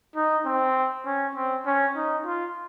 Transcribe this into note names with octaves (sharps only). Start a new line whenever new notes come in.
D#4
C4
C#4
C4
C#4
D#4
F4